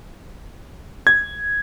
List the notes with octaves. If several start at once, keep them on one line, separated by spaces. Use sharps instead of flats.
G#6